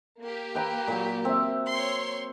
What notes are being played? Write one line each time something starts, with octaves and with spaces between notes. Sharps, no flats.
A#3 G4
B4 G5 A#5
A#2 F#3
C4 E5
C#5 C6